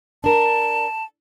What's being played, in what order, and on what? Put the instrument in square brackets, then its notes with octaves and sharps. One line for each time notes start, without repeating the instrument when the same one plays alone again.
[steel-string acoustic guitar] D4 A#4 [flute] A5